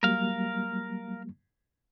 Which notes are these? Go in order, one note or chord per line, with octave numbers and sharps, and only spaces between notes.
F#3 G3 A#3 A#4 F5